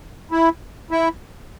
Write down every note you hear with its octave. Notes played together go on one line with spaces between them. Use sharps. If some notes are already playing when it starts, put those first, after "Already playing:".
E4
E4